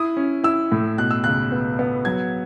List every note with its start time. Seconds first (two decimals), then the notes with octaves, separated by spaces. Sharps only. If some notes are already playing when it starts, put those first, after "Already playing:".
Already playing: E4 D#6
0.17 C#4
0.44 E4 E6
0.72 A2
0.98 B2 F#6
1.11 E6
1.24 C#2 F#6
1.52 B3
1.79 B3
2.05 F#3 G#6